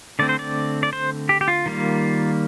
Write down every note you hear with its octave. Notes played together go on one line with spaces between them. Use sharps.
D3 A3 C4 D5
C5
D5
D5
C5
G4
G4
F4
D#3 G3 A#3